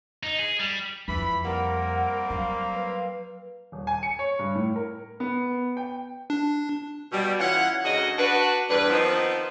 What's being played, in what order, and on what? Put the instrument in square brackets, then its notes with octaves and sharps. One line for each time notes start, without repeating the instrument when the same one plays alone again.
[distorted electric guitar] D#4
G#4
G3
[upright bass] F2 [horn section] E3 B5
[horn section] G3 A#3 C4 [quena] A#4 [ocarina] F#5
[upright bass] F#3 [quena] F5 [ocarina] A#5
[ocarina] B4
[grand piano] D#1
G#5
C#7
C#5
G2
A2
A#4
B3
G5
[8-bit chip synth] D4
[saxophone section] B2 G3
E3 C#4 F4 F#5
D2 C#3 D#4 F#4 D#5
D4 F#4 B4
E2 G2 D4 B4
D#3 F3 B3 C4 D#4 B4